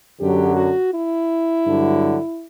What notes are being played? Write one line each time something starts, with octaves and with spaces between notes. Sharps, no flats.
F#2 D3 F#3 G4
F#4
E4
G2 D3 F#3